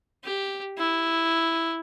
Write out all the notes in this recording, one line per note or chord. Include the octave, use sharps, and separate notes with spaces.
G4
E4